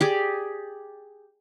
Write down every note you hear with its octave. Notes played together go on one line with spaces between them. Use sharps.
G4 G#4 D5